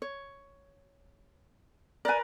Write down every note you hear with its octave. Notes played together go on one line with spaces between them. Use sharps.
C#5
A#4 B4 D5 G#5